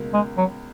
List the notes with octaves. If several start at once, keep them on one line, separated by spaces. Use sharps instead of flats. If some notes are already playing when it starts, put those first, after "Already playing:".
Already playing: C#2 B2 A#3
G#3
F#3